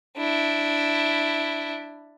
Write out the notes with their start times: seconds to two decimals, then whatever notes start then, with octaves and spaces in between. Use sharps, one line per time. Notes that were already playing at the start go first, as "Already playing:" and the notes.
0.17 D4 E4